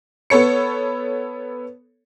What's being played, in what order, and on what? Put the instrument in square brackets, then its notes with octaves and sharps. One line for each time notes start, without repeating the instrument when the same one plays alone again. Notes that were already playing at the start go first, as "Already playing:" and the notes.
[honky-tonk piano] B3 A4 C#5 C#7